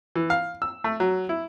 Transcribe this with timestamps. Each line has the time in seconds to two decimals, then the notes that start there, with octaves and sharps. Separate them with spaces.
0.16 E3
0.30 F5
0.62 E6
0.84 A3
1.00 F#3
1.29 E4